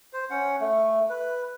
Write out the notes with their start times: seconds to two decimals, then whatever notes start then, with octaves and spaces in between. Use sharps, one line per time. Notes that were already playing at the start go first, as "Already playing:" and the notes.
0.13 C5
0.30 C#4 F#5
0.60 A3
1.10 B4